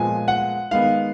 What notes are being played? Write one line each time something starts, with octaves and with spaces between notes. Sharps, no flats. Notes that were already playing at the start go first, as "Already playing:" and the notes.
Already playing: A#2 F3 G#3 B3 G#5
F#5
D#3 G#3 B3 F5